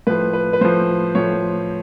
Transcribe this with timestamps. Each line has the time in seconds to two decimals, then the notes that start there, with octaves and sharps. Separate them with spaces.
0.07 A2 F3 B4
0.33 B4
0.53 B4
0.61 A2 F3 C5
1.15 A2 F3 C#5